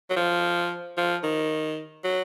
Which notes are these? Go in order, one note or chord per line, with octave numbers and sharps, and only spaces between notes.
F#3
F3
F3
D#3
F#3